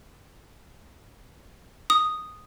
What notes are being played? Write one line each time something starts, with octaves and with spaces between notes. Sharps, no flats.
D#6